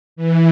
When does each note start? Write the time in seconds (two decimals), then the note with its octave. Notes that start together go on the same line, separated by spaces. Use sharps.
0.16 E3